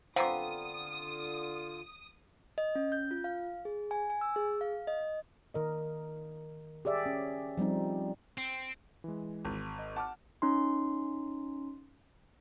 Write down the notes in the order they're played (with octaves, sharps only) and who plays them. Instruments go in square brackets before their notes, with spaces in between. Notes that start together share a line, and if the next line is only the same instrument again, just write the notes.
[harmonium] D3 F4 [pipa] B3 C4 [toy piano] F5 A#5 D6 [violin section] D#6
[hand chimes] D#5
C#4
G6
F4
F5
G#4
G#5
G#5
E6
G#4
F5
D#5
[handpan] D#3 A#4 D#5
G4 G#4 D5 E5
C#4
F3 G3 C4 D#4
[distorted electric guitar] C4
[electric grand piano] E3 G#3
[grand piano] G#1
[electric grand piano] D#5
[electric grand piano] F#5 D6 F6 [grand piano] A5
[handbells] C#4 D#4 C6